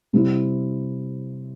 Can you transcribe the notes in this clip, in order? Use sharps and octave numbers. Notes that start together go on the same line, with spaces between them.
C3 G3 C4 E4